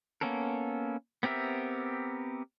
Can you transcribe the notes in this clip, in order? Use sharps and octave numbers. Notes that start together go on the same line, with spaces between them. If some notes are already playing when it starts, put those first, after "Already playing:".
A#3 B3 C#4 A4 A#4
B3 C4 G4 A#4 E5